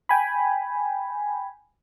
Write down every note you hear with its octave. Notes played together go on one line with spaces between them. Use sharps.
G5 G#5 B5